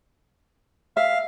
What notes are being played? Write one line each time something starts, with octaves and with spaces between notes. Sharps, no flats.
E5 F5